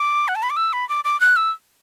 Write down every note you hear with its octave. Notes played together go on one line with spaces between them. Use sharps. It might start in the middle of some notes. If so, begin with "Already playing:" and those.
Already playing: D6
F#5
A5
B5
D6
E6
B5
D6
D6
F#6
E6